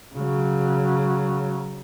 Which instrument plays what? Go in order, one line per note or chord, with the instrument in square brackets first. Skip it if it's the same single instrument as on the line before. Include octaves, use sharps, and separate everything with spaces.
[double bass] C#3 F#3